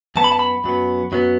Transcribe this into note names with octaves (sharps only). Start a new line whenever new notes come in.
F#2 F#3 B3 A5
B5
A5
B5
F#2 F#3 B3
F#2 F#3 B3